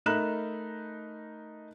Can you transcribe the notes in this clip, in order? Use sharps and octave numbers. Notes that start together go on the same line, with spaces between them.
A3 D#4 A#4 B5 F#6 E7